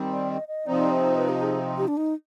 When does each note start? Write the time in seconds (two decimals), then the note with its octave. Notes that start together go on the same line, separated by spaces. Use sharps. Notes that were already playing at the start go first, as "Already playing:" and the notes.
Already playing: D#3 G3 C4
0.11 D5
0.29 D#5
0.48 D#5
0.66 C3 F3 C4 D#4 D5
0.91 C5
1.17 B4
1.29 G4
1.42 G#4
1.78 G4
1.88 D4
1.97 D#4